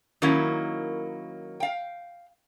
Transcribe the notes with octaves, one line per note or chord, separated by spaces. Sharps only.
D#3 F#3 A#3 C#4 E4
F5 G5